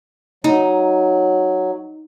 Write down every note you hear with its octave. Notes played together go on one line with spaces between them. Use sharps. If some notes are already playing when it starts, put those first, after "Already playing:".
F#3 D#4